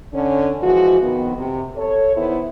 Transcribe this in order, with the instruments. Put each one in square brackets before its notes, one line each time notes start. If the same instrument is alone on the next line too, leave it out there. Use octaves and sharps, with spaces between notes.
[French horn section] D3 C#4
E3 F3 G#3 F#4
F2 D#3 B3
C3
A4 C#5
E2 D#3 B3 E4 C5